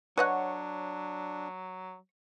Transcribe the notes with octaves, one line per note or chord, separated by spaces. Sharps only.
F#3 D4 B4 C#5 D#5 F#5